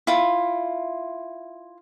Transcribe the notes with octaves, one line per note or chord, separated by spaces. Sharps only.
E4 F4